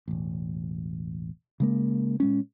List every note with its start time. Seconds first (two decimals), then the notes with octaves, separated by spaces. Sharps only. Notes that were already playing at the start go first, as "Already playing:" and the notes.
0.08 E1 A1
1.60 C#3 G#3 A#3
2.20 A#2 G#3 C#4